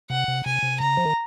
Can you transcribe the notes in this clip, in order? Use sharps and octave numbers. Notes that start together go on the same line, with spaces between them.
C3 F#5
C3
C3 G#5
C3
C#3 A#5
F3
D#3